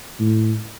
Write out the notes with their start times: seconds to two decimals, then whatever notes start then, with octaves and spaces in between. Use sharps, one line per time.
0.19 A2